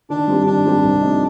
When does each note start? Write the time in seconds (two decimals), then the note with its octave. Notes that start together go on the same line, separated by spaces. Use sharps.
0.10 D#3 D4
0.27 G3 C4 G4
0.46 D#3 D4
0.65 G3 C4 G4
0.84 C2
1.01 C3 F3 A3 D#4